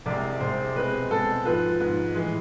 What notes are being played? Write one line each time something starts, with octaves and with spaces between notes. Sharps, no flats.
C2 C3 G#3 D5
C2 C3 G#3 C5
B2 G#3 C4 B4
B2 G#3 C4 A4
G#2 F3 B3 B4
G#2 F3 B3
A2 E3 G#3